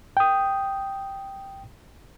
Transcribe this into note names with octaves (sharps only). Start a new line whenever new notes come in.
G5 D#6